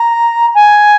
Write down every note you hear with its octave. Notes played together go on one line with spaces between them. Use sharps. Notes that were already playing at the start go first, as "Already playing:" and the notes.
Already playing: A#5
G#5